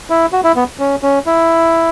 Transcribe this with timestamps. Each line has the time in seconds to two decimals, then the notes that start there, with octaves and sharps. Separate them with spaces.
0.10 E4
0.33 F#4
0.44 E4
0.56 B3
0.79 C#4
1.03 C#4
1.26 E4